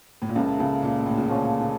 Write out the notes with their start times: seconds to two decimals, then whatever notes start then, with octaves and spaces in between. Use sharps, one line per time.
0.22 A2
0.29 A#2
0.35 C#2 C#3 F3 A#3 E4 A4
0.59 C#2 C#3
0.82 A#2
1.06 A2
1.17 C#3
1.28 A#2 D3 F3 C#4
1.59 C#3